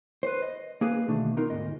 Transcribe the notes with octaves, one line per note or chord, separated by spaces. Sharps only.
B4 C5
D#5
A#3 G#4 B4 F5
B2 D3 D#3 A3 D4
B3 D#4 F4 A#4
D2 G#2 D#5